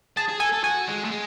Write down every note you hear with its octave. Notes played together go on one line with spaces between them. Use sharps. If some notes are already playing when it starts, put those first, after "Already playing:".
G#4 A5
G#4
A4 G#5
A4
F#4 G#5
G#3
A3
G#3